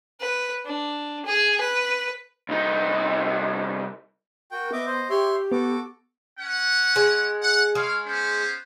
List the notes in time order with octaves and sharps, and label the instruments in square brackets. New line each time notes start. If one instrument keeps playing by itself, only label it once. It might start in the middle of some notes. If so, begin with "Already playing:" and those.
[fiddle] B4
D4
G#4
B4
[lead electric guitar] C2 D#4
[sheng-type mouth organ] F#4 G5 [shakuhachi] A#4
[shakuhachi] B3 [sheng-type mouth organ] D#5 E5 D6
[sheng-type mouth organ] C5 D#5
[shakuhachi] G4 [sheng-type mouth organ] C#5 E5 C6
[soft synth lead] B3 [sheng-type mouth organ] F#4 A4 D6
[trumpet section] C#4 F#5
[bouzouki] G#3
[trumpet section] F#5
[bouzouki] G#3 [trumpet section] C#5 F5
[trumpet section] B3 C#4 C5